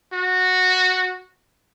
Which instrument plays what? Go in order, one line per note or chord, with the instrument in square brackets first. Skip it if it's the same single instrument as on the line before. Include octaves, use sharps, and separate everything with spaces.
[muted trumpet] F#4